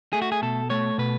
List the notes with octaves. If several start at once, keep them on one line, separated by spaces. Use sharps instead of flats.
A3 G#4
F#4
G#4
B2 A4
A3 C#5
B2 B4